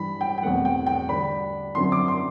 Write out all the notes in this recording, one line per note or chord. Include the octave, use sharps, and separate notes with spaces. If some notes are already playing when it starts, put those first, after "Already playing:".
Already playing: G2 E3 G3 D4 B5
G5
G5
E2 B2 A3 C4 F#5
G5
G5
D3 G3 D4 B5
F#2 D3 F#3 C4 E4 C6
D6
C6